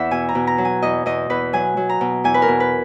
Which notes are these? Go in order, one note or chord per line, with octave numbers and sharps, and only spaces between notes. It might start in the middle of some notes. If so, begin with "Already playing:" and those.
Already playing: E2 E5 F#5
B2 G#5
A#5
B2
A#5
F#3
G#5
E2 D#5
E2 D#5
E2 B4
F#3 G#5
F#3
A#5
B2
E2 G#5
B4
A#4
B2
B4